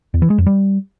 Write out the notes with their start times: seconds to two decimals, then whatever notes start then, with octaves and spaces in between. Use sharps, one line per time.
0.14 E2
0.22 E3
0.30 G#3
0.38 F2
0.46 G3